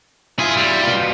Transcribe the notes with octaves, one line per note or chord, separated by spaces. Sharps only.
E4 F4 G#4
G3
B2 F4